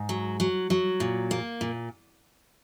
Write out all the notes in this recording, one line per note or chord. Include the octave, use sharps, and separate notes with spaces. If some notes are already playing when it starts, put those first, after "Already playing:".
Already playing: G#2
F#3
F#3
F#3
A#2
A#3
A#2